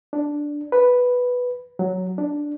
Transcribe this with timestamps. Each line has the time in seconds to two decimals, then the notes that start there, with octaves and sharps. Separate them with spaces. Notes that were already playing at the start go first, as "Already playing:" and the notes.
0.13 D4
0.72 B4
1.79 F#3
2.18 D4